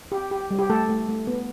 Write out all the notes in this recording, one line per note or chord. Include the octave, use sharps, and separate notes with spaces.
G4
G4
G3
G4
A3 A4
A3
A3
B3